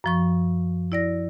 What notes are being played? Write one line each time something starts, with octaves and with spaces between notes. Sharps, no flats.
F#2 F3 C#6
E4 D5 A#6